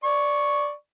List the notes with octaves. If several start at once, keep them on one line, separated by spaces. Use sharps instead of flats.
D5 C#6